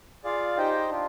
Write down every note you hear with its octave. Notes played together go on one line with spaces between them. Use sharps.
F4 G#4 D5 F5
D#4 G4 C5 D#5 G5
D4 F4